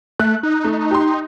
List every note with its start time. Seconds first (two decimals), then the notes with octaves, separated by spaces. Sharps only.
0.19 A3 F#6
0.43 D#4
0.64 A3
0.91 G4 C6